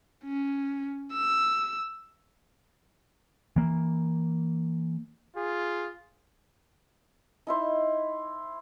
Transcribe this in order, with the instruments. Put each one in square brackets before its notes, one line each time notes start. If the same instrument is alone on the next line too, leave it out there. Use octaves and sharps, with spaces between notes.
[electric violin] C#4
E6
[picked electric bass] E3 A#3
[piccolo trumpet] F4 [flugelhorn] G#4
[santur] D#4 E4 C5